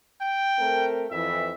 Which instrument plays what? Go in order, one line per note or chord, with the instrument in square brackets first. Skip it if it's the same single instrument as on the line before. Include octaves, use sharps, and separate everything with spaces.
[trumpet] G5
[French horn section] A3 C4 A#4
[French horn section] F2 E3 [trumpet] E5